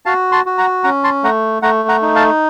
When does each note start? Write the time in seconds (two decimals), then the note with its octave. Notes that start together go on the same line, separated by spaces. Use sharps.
0.06 F#4 F5 A5
0.32 A5 C6
0.46 F#4
0.58 F#5 A#5
0.84 C#4 F#5 A#5
1.04 A5 C6
1.23 A3 F#5 A#5
1.62 A3 F#5 A#5
1.89 F#5 A#5
2.02 D#4
2.15 F5 A5